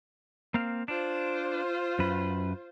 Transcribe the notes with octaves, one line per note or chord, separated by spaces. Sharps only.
A#3 C4 F5
D4 F4 C5
F#2 B4